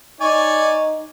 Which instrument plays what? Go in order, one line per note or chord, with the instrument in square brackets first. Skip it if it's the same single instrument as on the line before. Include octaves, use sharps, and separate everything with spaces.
[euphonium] D#4 [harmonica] C#5 D5 G#5